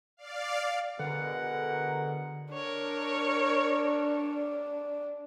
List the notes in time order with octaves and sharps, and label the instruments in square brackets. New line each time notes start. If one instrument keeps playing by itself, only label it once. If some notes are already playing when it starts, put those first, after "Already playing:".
[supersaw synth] D5 F5
[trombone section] B2 G#3 A#4 [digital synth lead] D3 [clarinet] F#5
[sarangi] D4 [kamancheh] A#4 C#5